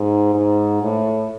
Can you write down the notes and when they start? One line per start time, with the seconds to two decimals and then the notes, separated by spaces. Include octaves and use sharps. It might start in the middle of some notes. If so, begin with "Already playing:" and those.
Already playing: G#2
0.34 G#2
0.83 A2